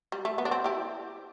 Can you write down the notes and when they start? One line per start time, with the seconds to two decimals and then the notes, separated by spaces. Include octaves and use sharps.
0.12 G3
0.25 A3
0.38 B3
0.45 D4
0.51 C4
0.64 E4 G4